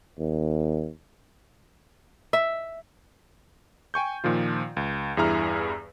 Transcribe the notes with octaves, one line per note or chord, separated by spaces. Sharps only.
D#2
E5
G5 G#5 C#6 G6
A#2 D#3 F3 F4
C#2
E2 G2 E4 G#4 A#5 F6